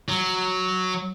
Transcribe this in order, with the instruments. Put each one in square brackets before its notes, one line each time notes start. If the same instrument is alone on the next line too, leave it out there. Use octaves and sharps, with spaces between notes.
[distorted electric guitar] F#3